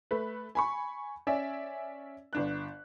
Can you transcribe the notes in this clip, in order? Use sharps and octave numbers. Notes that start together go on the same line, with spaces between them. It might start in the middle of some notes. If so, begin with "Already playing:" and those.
A3 B4
G#5 B5 C#6
C#4 D5 E5 G#5
G1 D4 F#6